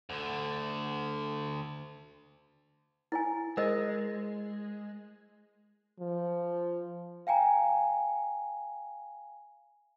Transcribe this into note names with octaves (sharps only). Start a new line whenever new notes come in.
D2 D3
E4 C#5 G#5
G#3 A#4 C5 D#5
F3
F5 G5 G#5 A#5